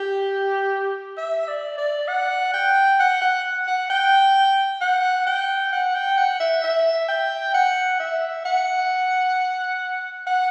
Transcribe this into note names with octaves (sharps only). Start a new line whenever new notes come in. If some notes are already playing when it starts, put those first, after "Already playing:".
Already playing: G4
E5
D5
D5
F#5
G5
F#5
F#5
F#5
G5
F#5
G5
F#5
G5
F#5
E5
E5
G5
F#5
E5
F#5
F#5